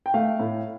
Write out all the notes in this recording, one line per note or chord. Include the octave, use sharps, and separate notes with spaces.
G5
A3 F5
A2